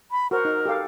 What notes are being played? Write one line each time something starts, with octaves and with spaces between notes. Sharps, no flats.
B5
F#4 A#4 C5
D#4
G4 A4 F5